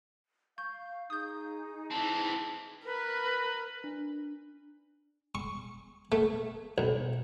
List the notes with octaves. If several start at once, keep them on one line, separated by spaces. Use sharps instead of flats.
F5 C#6 G6
D#4 G#4 D#6 G6
E3 C4 A5
A#4 B4
D4
C#6
A3
B1